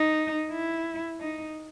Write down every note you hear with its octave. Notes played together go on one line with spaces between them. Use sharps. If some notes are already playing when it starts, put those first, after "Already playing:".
Already playing: D#4
E4
D#4